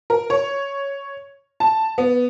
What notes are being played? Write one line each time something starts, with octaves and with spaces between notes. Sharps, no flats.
A#4
C#5
A5
B3